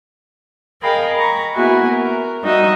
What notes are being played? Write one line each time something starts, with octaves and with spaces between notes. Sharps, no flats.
G#4 A#4 D#5 F5 G5 B5
A#5 B5 C#6
A#3 B3 E4 F#4 G#4 G#5
A#4
G3 D#4 F#4 D#5 E5